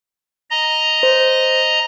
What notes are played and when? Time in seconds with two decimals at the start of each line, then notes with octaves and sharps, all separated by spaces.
0.50 D#5 A#5
1.03 C5